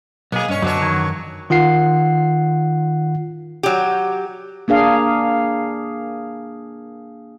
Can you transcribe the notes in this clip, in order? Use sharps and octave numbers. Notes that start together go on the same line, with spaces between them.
B1 A#3 G#4 D#5
G2 C#4 C#5 D#5
F#2 B2 D3 F#3 C#5
D#3 E3 C#6
D#3 F4 F#5 C7
F#3 G4
A#3 D4 G#4 F5